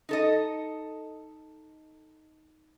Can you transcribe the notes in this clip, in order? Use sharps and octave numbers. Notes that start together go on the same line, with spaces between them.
D#4 A4 D#5